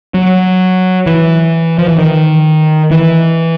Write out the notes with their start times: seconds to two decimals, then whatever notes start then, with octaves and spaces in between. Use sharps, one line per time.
0.14 F#3
1.06 E3
1.79 F3
1.88 E3
1.99 D#3
2.91 E3